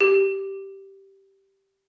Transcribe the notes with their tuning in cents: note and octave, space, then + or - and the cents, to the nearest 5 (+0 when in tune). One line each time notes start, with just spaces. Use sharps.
G4 -10